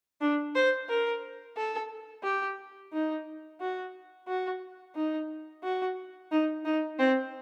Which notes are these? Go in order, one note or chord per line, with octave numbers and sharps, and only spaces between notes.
D4
C5
A#4
A4
G4
D#4
F#4
F#4
D#4
F#4
D#4
D#4
C4